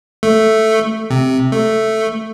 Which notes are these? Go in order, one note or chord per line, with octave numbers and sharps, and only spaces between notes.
A3
C3
A3